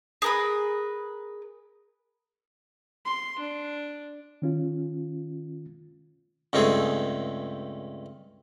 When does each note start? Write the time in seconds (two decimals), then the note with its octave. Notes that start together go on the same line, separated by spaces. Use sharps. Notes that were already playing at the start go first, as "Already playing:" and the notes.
0.22 G#4 A#4 B4
3.05 C6
3.39 D4
4.42 D#3 C#4 F4
6.53 C#2 G2 A3 C4 G#4